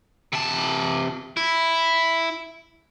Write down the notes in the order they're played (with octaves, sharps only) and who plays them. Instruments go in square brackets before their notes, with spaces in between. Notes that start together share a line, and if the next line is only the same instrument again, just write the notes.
[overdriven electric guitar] C3 A5
E4